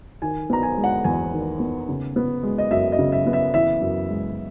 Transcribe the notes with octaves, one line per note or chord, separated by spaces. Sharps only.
D#3 G#5
B3 A#5
G#5
G#3
F#5
E2 G#5
D#3
B3
C#3
B3
G#3
D#5
F#2 E5
D#5
C#3
E5
B3
E5
E3 E5
F#2
G#3